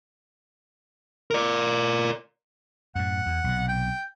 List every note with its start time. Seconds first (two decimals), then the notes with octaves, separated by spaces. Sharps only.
1.31 A#4 D5
2.95 F#2 A2 F#5
3.26 E2
3.44 B1 C3
3.68 G5